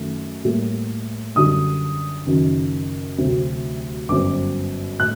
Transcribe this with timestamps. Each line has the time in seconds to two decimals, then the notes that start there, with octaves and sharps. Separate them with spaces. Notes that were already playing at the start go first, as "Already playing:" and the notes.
Already playing: F#2 D#3 A3
0.44 A2 G3 A#3
1.35 F#2 D3 G3 D4 D#6
2.26 F#1 F#2 D#3
3.18 D2 C3 F#3 C4
4.09 G1 F#2 F#3 C4 D6
5.00 A2 F#6